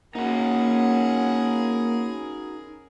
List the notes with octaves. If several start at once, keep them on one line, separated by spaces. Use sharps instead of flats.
A#3 C#4 D#4 F#4 G#4 A#4 F#5